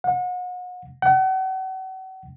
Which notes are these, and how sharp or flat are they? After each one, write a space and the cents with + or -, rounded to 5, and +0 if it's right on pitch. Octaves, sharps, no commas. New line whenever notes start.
F#5 -35
F#5 +40